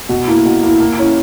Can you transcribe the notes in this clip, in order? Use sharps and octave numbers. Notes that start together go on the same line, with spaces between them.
B2
A#3 E4
B2
A#3 E4
A#3
C#4 E4